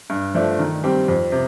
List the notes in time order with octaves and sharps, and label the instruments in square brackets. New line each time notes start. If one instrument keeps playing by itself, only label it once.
[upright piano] G2
F3 A3 D4
D#3
G3 C4 G4
F2
C3